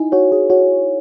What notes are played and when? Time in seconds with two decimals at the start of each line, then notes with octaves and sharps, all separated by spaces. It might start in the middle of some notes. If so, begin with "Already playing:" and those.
Already playing: D#4 E4 G#5
0.12 F#4 C#5
0.32 G#4
0.50 F#4 C#5